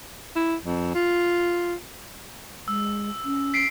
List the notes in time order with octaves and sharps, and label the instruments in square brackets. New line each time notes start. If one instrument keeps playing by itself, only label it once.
[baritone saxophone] E4
F2
F4
[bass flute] G#3 [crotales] E6
[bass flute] C#4
[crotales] B6 C7 D7